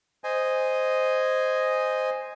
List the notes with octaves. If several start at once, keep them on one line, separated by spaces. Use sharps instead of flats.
C5 D#5 G#5